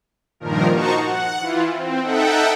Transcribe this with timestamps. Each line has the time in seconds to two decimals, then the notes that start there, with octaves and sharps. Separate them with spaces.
0.40 G2 A#2 D#3 F3 A#4
0.70 D#4 F#4 C5 A5 A#5 C#6
1.01 F#5
1.40 E3 E4 F4
1.70 C4
2.02 D#4 A4 E5 F#5 G5